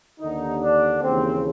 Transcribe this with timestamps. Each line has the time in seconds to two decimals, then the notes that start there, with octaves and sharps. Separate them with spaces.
0.20 D#2 D3 D#4
0.62 D4
1.02 D#2 C#3 E3 C4